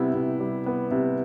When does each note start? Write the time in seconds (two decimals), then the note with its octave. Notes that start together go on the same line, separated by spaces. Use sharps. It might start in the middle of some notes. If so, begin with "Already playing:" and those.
Already playing: C3 G3 B3 E4
0.14 C3
0.40 G3
0.66 B3
0.91 C3